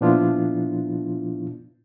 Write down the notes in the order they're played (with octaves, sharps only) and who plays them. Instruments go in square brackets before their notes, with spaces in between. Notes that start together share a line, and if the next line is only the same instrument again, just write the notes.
[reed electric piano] A#2 F3 B3 D4 E4 F4